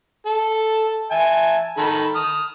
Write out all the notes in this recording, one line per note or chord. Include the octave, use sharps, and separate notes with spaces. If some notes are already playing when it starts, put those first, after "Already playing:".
A4
E5 G#5 A5
D#3 A4 B5
D#6 F6